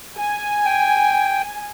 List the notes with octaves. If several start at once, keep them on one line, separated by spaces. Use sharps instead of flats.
G#5
G5